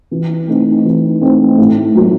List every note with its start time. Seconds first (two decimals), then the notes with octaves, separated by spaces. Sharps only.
0.11 E3
0.48 A3 C4 D#4
0.85 E3
1.21 A3 C4 D#4
1.58 A2
1.95 F#3 A#3